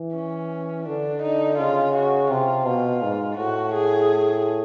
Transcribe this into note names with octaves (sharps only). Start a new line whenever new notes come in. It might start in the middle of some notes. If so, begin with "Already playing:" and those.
Already playing: E3
C#4
D3 D4
D#4
C#3 F4
F#4
C3 F4
B2 F4
G#2
A2 F#4
G#4